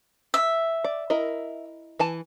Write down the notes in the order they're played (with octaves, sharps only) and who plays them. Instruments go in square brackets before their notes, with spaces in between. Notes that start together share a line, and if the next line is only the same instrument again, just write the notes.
[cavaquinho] E5
[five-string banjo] D5
E4 A#4 D#5
E3 G#5 A5